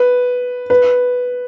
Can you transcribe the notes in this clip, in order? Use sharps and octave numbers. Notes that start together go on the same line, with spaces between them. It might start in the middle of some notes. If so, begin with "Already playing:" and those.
Already playing: B4
B4